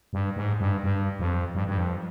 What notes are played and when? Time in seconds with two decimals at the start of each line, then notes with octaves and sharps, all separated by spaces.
0.13 G2
0.36 G#2
0.60 G2
0.84 G2
1.20 F2
1.55 G2
1.68 G2
1.78 F2